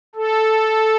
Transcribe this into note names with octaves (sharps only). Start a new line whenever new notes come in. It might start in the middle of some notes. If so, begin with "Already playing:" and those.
A4